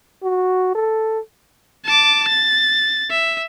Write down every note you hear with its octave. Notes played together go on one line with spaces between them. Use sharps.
F#4
A4
A5 D6
A6
E5